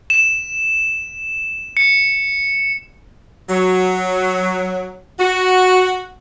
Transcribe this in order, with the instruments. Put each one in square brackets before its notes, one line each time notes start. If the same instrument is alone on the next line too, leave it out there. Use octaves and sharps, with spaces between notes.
[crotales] E7
C#7
[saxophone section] F#3
F#4